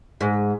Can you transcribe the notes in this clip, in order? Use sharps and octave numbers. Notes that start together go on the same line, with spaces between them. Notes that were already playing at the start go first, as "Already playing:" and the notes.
G#2